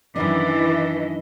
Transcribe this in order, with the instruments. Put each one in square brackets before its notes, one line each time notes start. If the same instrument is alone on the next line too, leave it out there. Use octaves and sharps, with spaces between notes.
[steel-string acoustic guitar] F#2 D#3 D4 [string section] E3 [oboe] D5 [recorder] D#5